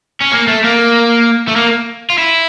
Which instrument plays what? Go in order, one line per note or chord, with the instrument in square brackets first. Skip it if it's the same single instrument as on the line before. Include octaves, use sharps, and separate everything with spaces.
[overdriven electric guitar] C#4
A#3
A3
A#3
A3
A#3
F4
E4